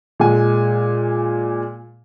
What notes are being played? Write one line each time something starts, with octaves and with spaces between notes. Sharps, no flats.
A#2 G#3 G#5